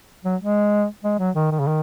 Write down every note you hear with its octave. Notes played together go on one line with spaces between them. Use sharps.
F#3
G#3
G#3
F#3
D#3
D#3
C#3
D#3